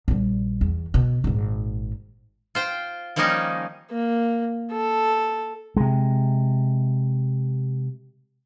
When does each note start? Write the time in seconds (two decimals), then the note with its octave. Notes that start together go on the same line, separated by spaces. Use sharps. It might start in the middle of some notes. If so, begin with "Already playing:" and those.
0.08 A#1 G3
0.61 E2
0.94 B2
1.24 G#1 A#2
2.55 F4 C5 G5
3.16 D#3 F3 G3 A#3 C#4 D#4
3.91 A#3
4.72 A4
5.76 C3 G#3